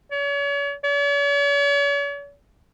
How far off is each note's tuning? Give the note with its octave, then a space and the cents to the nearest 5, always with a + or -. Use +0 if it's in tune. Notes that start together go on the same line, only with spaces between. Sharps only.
C#5 +40
C#5 +45